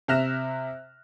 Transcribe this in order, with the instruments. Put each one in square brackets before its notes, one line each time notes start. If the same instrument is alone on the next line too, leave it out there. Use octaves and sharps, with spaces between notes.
[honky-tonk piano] C3 E5 F6 F#6 A#6 E7